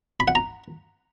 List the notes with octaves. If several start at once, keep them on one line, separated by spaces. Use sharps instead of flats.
B5
F#5
A#5